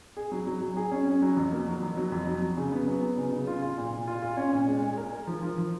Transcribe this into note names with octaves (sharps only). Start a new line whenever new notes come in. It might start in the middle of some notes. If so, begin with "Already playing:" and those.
G#4
F#3
F#3
F#3
G#4
C#4
C#4
F#3
F2
A#3
F#3
F2
F#3
F2
F#3
F#3
C#3
B3
F#3
B3
C#3
C#3
F4
F4
A#2
A#2
F4
F4
C#4
A#2
G#3
G#3
A#4
A#4
F3
F3
F3